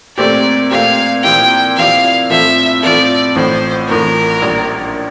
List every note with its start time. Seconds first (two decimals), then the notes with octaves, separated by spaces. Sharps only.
0.17 A#2 A3 C4 G4 D5
0.71 A#2 A3 C4 G4 F5
1.23 A#2 F3 C4 E4 G4 G5
1.76 A#2 F3 C4 E4 G4 F5
2.30 A2 F3 C4 F4 A4 E5
2.83 A2 F3 C4 F4 A4 D5
3.35 A1 A2 F3 C5
3.89 A1 A2 F3 A#4
4.42 A#1 A#2 G3